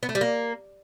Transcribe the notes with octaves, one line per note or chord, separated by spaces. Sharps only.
B3
A3
G3
A#3